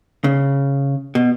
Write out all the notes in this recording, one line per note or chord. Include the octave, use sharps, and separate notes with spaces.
C#3
B2